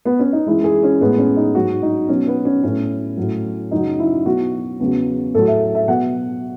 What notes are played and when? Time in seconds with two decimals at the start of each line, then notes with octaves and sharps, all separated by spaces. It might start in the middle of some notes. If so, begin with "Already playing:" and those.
0.05 B3
0.19 C#4
0.33 D#4
0.47 F#2 E3 G#3 E4
0.64 G#4
0.83 C#4
1.01 A2 G#3 B3
1.18 C#4
1.37 D#4
1.55 G#2 F#3 F#4
1.83 D#4
2.08 B2 F#3 C#4
2.27 B3
2.45 C#4
2.63 A2 F#3 C#4
3.17 A2 F#3
3.71 F#2 C#3 F#3 D#4
3.99 E4
4.26 B2 F#3 F#4
4.80 E2 C#3 F#3
5.34 A2 F#3 A4
5.47 E5
5.75 E5
5.88 B2 F#3 F#5